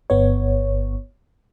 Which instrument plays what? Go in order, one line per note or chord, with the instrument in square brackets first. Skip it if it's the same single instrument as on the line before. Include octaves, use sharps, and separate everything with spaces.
[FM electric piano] G1 B3 C#5